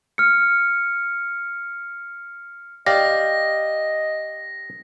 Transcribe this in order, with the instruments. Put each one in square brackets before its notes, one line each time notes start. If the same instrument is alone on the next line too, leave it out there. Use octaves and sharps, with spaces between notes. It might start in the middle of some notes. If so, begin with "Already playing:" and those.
[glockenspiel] F6 C#7
[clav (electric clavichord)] G4 D5 F5 [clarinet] D#5 [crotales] A#6